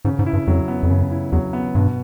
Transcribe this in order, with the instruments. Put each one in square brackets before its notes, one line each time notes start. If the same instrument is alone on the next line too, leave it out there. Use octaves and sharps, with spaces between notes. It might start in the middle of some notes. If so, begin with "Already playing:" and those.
[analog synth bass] G#2 [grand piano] C#3
[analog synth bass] G#2
[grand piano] E4
[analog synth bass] G2
[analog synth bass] F2 [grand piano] F#3
[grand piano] B3
[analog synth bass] F2
[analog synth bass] F#2 [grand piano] C#3
[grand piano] E4
[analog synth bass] E2 [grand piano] F#3
[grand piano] B3
[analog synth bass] G2 [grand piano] B2